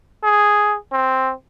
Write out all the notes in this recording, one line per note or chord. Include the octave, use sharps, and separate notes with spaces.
G#4
C4